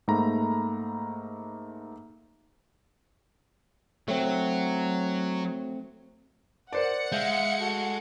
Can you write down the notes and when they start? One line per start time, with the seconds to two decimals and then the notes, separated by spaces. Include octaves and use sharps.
0.08 G#2 A3 A#3 A#5 B5
4.08 F#3 A3 C4
6.73 A#4 C5 D5 F#5 C#7
7.12 G#3 E5 F5 G6
7.60 F#4 A4